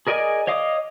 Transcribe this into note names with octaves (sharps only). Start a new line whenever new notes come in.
G#4 A#4 D5 D#5 G#5
C#5 D#5 F5 D6 D#6